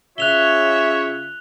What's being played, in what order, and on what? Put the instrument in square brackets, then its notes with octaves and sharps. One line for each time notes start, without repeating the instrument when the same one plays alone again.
[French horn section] C#3 F4 [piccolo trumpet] C#5 [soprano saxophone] E5 [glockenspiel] F#6 F7 G7